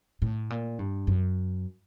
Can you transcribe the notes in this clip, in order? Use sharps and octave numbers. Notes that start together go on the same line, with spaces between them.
A2
A#2
G2
F#2